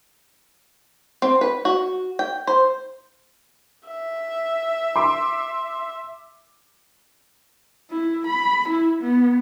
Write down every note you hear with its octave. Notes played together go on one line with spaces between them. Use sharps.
C4
B4
F#4
G5
C5
E5
C6 D6
E4
B5
E4
B3